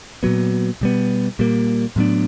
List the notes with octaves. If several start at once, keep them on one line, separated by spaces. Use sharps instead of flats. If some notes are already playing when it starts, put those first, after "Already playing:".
A#2 F#3 B3
B2 G3 B3
A#2 G3 A#3
A2 F#3 B3 D4